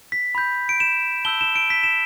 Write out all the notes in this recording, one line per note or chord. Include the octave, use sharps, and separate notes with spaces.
B6
B5 G6
D7
E7
A5 E6 G6 G7
E7
D7
B6
E7